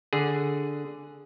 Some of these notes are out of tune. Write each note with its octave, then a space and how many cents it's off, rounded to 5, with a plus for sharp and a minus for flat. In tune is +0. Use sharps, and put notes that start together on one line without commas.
D3 +0 G#4 +0 F#5 +0